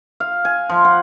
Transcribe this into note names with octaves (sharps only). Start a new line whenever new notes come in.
F5
G#5
F3
F#5